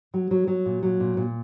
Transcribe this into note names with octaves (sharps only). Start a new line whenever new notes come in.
F#3
F#3
F#3
A#2
F#3
A#2
A#2